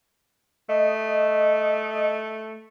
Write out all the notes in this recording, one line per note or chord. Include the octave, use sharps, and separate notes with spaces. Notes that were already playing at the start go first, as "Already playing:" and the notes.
A3 D#5